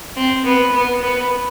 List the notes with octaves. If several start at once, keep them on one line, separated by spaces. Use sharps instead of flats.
C4
B3
B3
B3